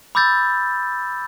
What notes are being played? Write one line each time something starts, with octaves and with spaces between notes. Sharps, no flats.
B5 D6 E6 G6 A6